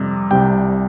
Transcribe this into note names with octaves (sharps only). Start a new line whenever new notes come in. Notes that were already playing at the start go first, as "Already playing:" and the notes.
Already playing: F2 C3 G3
C2 C3 G3 G5